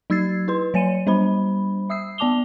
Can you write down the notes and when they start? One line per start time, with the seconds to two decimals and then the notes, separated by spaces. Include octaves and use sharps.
0.10 F#3 D#4 E6 G#6 A6 C7
0.48 E4 B4 C6
0.74 F#3 C#5 G#5 C#7 D#7
1.07 G3 D4 C5 B5
1.90 E5 D#6 E6 C7
2.18 B3 D5 A5 D6 F7 G7